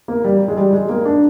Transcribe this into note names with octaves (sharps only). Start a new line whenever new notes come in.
A#3
G3
G#3
G3
G#3
A#3
D4